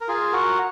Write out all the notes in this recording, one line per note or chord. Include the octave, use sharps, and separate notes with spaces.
A#4
F4 G#4
F#4 A#4